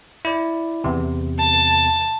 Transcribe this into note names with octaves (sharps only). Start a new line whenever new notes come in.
E4 D5
E2 C3
A5